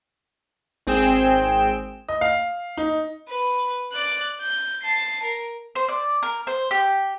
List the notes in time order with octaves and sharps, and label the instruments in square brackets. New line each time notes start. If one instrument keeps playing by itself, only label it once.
[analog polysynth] G#1 C4 G#4 G5 E7
[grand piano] D#5
F5
D#4
[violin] B4
D5 F#6
G6
A5 C7
A#4
[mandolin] C5
D5
A#4
C5
G4